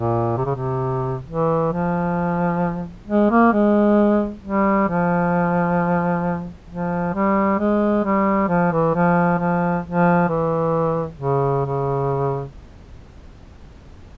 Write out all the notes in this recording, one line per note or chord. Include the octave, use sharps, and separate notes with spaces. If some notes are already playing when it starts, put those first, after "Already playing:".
Already playing: A#2
C3
C#3
C3
E3
F3
G#3
A#3
G#3
G3
F3
F3
G3
G#3
G3
F3
E3
F3
F3
F3
E3
C#3
C#3